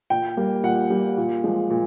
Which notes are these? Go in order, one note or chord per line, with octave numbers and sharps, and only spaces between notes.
A#2 G5
G3 A#3
A#2 F#5
G3 A#3
A#2
F3 G#3
A#2